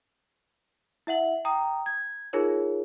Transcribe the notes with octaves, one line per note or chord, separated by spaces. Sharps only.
E4 E5 F#5 F#7
G5 A#5 D#6
G#6
D#4 F4 G#4 A#4 C#5